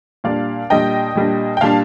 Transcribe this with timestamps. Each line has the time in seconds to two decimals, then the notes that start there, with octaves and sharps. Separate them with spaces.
0.24 A#2 G3 D4 D5 F5
0.70 A#2 G3 D4 D#5 G5
1.15 A#2 G3 D4
1.57 G5
1.61 A#2 G3 D4 F5 A5